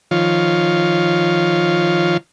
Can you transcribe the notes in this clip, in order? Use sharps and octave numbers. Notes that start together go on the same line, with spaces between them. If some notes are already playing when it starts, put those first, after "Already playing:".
D#3 F3 F4 C#5